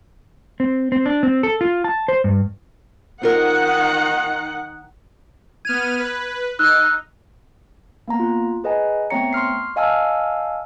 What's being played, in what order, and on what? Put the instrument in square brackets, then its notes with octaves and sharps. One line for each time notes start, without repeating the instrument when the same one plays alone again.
[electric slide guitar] C4
C4
D4
C4
A4
F4
A5
C5
G2
[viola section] D#3 D#4 F#5 [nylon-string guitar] C4 F4 A#4
[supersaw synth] B3 F6 D#7 [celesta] G#6
[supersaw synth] B4
[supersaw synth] D#4 [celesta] E6 F#6
[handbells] A#3 B3 A#5
F4
G#4 B4 D#5 F#5 G#5 A#5
A3 B3 C4 C#5 A#5 C#7
C6 C#6 F6 C7
D#5 F5 G#5 A5 E6 F6